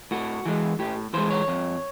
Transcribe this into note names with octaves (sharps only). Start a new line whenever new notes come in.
A2 F#4
E3 G#3
A2 G4
E3 G#3 C5
C#5
F2